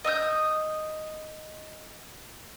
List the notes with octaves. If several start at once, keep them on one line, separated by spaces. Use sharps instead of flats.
D#5 D#6 E6 G6